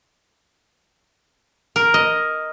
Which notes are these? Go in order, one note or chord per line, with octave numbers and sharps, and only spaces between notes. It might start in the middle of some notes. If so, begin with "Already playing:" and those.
A#4
D#5